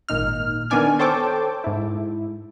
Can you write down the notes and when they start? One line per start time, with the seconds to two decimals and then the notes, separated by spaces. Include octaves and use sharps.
0.09 G#1 A#2 D#4 F6
0.70 D#3 B3 D4 D5 G#5 F6
0.99 A4 C5 C#5 G5 A5 D6
1.64 G#2 E4